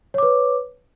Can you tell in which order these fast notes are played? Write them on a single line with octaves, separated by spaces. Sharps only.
C#5 D6 B4